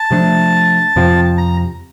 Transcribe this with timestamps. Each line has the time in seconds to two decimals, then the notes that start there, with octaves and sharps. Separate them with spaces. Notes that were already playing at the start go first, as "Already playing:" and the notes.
Already playing: A5
0.11 C3 F3 A3 D4
0.96 F2 C3 F3 C4
1.38 A#5